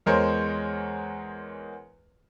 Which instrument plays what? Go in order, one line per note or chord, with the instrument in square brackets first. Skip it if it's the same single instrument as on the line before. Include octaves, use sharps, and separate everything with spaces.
[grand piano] E2 G#3 A#4 C5 C#5